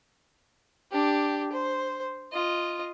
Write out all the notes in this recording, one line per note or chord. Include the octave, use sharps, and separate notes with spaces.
D4 G4
C5
F4 D#5